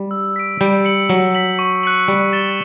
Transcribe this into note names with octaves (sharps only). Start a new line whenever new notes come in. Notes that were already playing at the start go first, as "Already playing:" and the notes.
Already playing: G3
E6
B6 D7
G3 G6
C#7 F#7
F#3 E6
B6 F#7
C#6
F#6 C#7 F#7
G3 F#6
A6 E7 G7